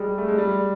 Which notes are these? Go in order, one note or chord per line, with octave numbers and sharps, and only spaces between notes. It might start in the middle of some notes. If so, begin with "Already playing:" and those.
Already playing: G3 G#3
A3
G#3
G3